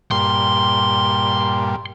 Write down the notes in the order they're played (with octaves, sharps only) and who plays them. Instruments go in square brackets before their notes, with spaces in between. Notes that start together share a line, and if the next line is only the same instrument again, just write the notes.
[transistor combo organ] G2 A#2 [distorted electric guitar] C6